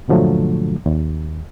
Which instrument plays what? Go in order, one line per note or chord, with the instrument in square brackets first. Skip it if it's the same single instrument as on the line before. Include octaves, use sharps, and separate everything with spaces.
[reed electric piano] G2 A#2 D3 F3 F#3 A3
D#2